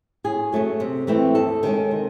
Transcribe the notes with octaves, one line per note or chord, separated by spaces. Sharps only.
A2 G#4
F#3 A3 C#4
C3
E3 A3 C4 E4
D#2 A4
D#3 G#3 C#4
C3